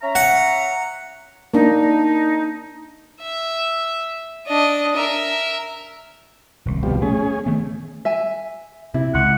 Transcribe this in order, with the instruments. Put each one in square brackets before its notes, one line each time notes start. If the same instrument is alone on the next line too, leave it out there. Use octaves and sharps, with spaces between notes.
[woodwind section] C#4 E5 A#5
[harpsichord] F#5
[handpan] A#3 D4 [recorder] D#4
[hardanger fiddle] E5
D4 D#5
A#4 E5
[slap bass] D#1 C2
[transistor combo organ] B2 F3 G3
[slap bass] A3 [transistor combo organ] C#4 G#4
[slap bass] D#3 A3 B3
[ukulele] E5 G#5
[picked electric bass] C3 [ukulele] E4
[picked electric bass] C#2 [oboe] F#5